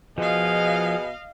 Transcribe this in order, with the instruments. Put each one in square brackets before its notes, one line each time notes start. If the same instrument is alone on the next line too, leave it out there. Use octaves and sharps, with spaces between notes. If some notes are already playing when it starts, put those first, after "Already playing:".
[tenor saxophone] B2 [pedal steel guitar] F3 F4 [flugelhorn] G#4 [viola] D#5 F5